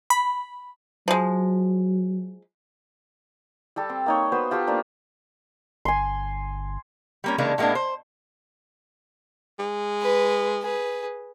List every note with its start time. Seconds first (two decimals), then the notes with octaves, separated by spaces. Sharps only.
0.10 B5
1.08 F3 F#3 G#3
3.76 G3 G4 A4
3.89 C4
4.06 A#3 D#4 C#5
4.32 B3 F#4 B4 C5
4.51 F4 G4 A4 C#6
4.67 A#3 D4 C5
5.85 G1 G#5 C6
7.24 G3 A#3 C#4
7.38 C#3 E3 G#3 A#3 D4
7.58 A2 G#3 A#3 B3 D4
7.75 C5
9.59 G#3
10.02 B4
10.61 G#4 B4